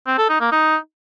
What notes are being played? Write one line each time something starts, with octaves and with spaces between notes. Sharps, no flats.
C4
A4
D#4
A#3
D#4